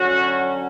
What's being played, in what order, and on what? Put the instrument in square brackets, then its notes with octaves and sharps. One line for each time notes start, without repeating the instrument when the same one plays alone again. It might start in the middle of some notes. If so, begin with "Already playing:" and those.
Already playing: [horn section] D3 F#3 C#4 F#4